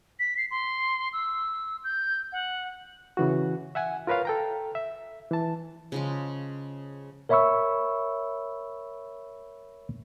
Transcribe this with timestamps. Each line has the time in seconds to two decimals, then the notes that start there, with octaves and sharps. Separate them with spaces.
0.19 B6
0.37 C7
0.51 C6
1.13 E6
1.84 G6
2.32 F#5
3.17 C#3 E3 F#4
3.75 E5 F#5 G#5
4.07 F4 A#4 B4 C#5 F5
4.25 A4 G5 A#5
4.75 E5
5.31 E3 A5
5.92 C#3 F3 G#3
7.29 A#4 C#5 E5 B5 C#6 E6